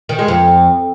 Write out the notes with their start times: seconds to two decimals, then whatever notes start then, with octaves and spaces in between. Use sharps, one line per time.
0.09 D#3
0.19 G#3
0.28 F2